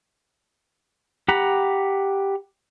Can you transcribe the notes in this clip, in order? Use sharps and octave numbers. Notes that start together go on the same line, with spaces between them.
G4 F#5 A#5 B5